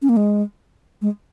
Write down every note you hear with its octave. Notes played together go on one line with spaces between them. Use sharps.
C#4
A#3
G#3
G#3